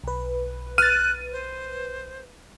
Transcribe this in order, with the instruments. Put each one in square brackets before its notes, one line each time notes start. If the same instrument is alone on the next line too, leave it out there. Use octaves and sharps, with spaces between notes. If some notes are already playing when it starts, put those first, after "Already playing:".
[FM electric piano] B1 B4
[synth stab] F6 A6 [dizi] F#6 [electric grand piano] D#7
[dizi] C5